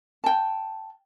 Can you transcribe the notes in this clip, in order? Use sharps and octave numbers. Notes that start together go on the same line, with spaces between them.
G5 A5